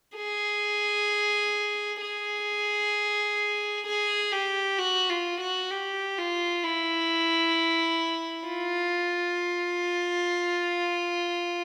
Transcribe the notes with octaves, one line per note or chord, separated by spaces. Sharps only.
G#4
G#4
G#4
G4
F#4
F4
F#4
G4
F4
E4
F4